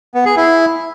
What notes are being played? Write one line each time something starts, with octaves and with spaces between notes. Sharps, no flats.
B3
G#4
E4